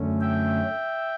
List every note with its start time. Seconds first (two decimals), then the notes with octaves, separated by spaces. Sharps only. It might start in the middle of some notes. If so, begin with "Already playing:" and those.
Already playing: F#2 D3 A3 C#4
0.21 E5 G5